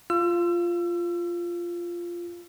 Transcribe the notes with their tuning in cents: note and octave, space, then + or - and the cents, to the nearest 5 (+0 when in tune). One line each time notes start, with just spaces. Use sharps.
F4 -10 E6 +35